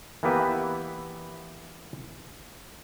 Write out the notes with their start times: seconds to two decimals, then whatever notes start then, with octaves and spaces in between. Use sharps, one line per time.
0.23 E3 A#3 B3 G4 B4 E5